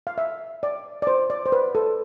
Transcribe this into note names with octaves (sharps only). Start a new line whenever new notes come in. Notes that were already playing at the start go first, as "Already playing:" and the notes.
F5
E5
D5
D5
C5
D5
C5
B4
A4